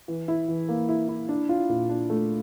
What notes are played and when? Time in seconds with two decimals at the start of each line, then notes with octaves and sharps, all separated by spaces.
0.08 E3
0.28 E4
0.48 E3
0.69 A#3
0.89 E4
1.08 E4
1.29 D4
1.49 F4
1.69 A#2
1.89 D4
2.10 A3